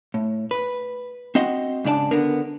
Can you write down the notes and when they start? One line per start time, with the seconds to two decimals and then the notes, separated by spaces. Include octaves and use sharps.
0.14 A2
0.51 B4
1.35 C4 F#4 D#5 F#5 C6
1.84 G#2 C#3 D4 D5 A5
2.11 D3 B3 D4 A#4